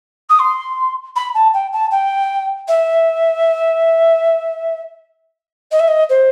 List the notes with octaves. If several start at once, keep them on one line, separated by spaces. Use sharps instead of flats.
D#6
C6
B5
A5
G5
A5
G5
E5
D#5
E5
D#5
C5